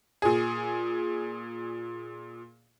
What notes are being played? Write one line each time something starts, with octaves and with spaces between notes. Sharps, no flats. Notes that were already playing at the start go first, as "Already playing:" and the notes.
A#2 G#4